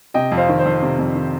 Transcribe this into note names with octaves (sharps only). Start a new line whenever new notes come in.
C3 D#5 G5
F2
C5 F5
D#3
C5
F2
C3
F2
D#3